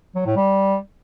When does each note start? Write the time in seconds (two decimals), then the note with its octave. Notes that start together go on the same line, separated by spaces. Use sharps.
0.15 F#3
0.26 A2
0.36 G3